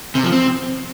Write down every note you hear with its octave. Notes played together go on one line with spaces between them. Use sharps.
C3
F3
C4